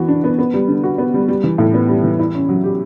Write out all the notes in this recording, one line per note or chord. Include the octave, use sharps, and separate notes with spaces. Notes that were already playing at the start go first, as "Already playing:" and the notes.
Already playing: E3 B3 F#4
D4
B3
B3
G3
D3
F#4
B3
G3
G3
E3
A2
B3
G3
E3
E4
C#4
F#3
G4